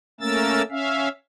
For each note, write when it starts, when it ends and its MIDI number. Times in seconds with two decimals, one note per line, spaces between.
0.21 0.62 57
0.21 0.62 58
0.21 0.62 61
0.21 0.62 70
0.21 0.62 88
0.21 0.62 93
0.70 1.08 61
0.70 1.08 76
0.70 1.08 77